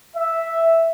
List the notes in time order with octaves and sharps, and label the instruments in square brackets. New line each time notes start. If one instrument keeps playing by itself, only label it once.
[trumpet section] E5